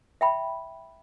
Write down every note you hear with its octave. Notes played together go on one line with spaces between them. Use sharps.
E5 G5 B5